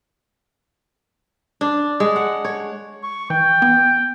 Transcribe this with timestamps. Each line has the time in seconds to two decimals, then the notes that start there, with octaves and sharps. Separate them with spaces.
1.61 D4
2.00 G#3
2.16 F#5
2.45 C#5
3.03 C#6
3.30 E3 G5
3.62 B3